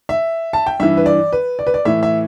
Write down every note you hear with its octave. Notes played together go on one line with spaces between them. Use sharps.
E5
A5
G5
G2 E3 E5
B4
D5
B4
D5
B4
D5
A2 E3 E5
E5